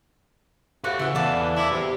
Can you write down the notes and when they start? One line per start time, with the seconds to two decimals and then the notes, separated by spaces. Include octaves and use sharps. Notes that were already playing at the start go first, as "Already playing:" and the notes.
0.84 A3 F#4 G4 F5 F#6
0.99 C#3 E3 E4 F#5
1.15 E2 E3 A4 D5 F5
1.56 E4 A5 D6
1.71 C3 G4